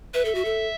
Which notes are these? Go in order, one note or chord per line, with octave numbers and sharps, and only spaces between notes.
B4 E5
A4
F#4
A4